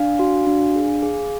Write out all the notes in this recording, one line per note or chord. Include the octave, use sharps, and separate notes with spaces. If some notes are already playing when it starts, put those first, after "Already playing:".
Already playing: D4 F5
F#4
D4
G#4
G#4